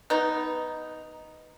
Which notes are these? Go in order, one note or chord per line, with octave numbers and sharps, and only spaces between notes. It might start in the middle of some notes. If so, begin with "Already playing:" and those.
B3 D#4